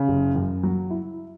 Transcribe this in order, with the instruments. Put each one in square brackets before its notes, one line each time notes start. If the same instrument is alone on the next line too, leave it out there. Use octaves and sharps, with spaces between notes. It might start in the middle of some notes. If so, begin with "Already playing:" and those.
Already playing: [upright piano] C#3
[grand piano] F#1
F#2
F#3
E4